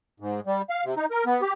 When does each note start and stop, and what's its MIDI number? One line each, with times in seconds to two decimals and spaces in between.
0.20 0.40 44
0.46 0.62 55
0.70 0.85 77
0.85 0.95 48
0.96 1.06 63
1.11 1.24 70
1.26 1.41 59
1.41 1.53 67